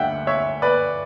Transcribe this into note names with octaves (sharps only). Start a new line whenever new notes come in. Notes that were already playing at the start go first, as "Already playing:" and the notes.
Already playing: D2 D3 G3 E5 F#5 G5
C#5 E5
B4 D5